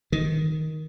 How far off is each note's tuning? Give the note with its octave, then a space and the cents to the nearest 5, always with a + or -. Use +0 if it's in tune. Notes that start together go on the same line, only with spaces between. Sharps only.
D#3 +10